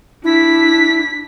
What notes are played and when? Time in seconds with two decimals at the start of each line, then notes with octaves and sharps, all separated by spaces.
0.24 D4 E4 B6